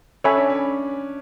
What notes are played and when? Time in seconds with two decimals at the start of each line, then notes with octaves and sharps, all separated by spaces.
0.24 C#4 A4 C#5 E5 G#5 B5
0.37 D4
0.49 C#4